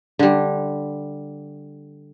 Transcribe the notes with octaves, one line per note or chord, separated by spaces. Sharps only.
D3 G3